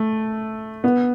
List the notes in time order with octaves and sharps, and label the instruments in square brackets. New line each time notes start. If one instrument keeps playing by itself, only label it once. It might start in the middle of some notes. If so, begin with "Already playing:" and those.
Already playing: [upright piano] A3
B3